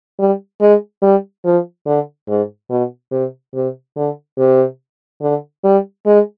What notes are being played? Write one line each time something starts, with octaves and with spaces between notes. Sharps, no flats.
G3
G#3
G3
F3
D3
G#2
B2
C3
C3
D3
C3
D3
G3
G#3